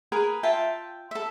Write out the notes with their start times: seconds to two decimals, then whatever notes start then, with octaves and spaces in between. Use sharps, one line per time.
0.12 G#4 A#4 B4 G#5
0.43 F4 E5 G5 A5
1.11 A4 E5